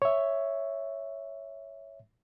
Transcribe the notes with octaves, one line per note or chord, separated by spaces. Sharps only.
C#5 E5